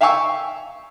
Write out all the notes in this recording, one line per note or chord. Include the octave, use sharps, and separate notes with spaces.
E5 F5 G5 G#5 C#6 E6